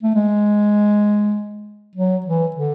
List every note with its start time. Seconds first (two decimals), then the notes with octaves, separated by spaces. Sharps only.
0.03 A3
0.14 G#3
1.96 F#3
2.26 E3
2.56 D3